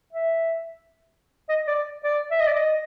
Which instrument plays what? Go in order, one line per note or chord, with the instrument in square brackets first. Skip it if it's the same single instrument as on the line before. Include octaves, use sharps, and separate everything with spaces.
[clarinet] E5
D#5
D5
D5
E5
D#5
D5
D#5